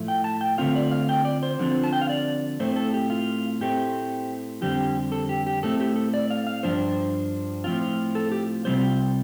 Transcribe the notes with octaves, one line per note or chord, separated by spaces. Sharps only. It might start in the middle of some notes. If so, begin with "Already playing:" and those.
Already playing: A2 F3 A3
G5
A5
G5
D3 A3 C4 F4 F5
D5
F5
G5
D5
C5
D3 F3 C4 F4
A5
G5
F5
D5
A2 A3 C4 C5
A4
G4
F4
A2 A3 C4 G4
F2 D3 G3 C4 G4
A4
G4
G4
A2 A3 C4 A4
G4
A4
D5
F5
F5
G2 F3 D4 C5
A2 F3 C4 F4
A4
G4
C3 G3 C4 F4 C5